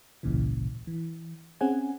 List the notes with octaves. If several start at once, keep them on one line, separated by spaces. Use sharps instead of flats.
G#1 C#2 A#2 C#3 E3
E3
C4 C#4 G#4 F#5 G#5